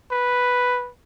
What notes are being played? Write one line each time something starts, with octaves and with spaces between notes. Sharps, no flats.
B4